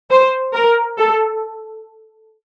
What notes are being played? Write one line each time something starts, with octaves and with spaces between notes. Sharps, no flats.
C5
A#4
A4